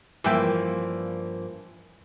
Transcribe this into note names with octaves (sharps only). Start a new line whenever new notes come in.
G2 E3 F3 A#3 E5 G5